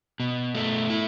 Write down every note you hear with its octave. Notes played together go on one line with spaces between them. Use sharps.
B2
A3
E4